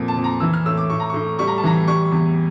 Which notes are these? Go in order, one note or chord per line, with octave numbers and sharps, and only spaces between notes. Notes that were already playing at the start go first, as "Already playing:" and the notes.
Already playing: F2 A#2
A5
F2
A#5
E3 E6
F6
A2 E6
D6
A2 C#6
A#5
A2 C#6
G3 C#6
A#5
A5
E3 A#5
G3 C#6
E2